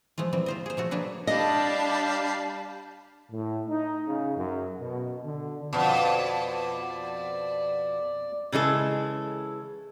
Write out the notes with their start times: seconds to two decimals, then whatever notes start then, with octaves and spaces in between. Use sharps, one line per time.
0.18 F3 G#3 A3 F4
0.33 E3 G3 C4
0.46 F4 C5 D#5
0.66 G#4 C5
0.77 F3 A3 F#4
0.91 F#3 A#3 D4 G#4 B4
1.27 G3 D4 D#5 F5 A5 B5
3.31 A2
3.68 D#4
4.07 C#3
4.36 F#2
4.81 B2
5.25 D3
5.73 F2 B2 D5
8.52 C#3 E3 G#3 A4